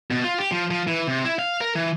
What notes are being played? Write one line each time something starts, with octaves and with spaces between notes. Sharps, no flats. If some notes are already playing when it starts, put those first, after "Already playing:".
B2
F4
G4
F3
F3
E3
C3
E4
F5
A#4
E3